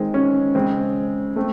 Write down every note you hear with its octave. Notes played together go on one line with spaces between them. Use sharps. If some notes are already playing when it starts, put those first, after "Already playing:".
Already playing: D#3 G#3 C4
C#4
C#3 G#3 C4
A3 C4